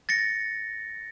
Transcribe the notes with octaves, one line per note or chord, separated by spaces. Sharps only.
A6 A#6 C#7